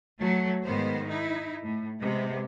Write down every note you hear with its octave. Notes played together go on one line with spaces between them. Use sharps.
F#3 A3
G#2 D#3 B3 C5
D#4 E4
A2
C3 G#3 B3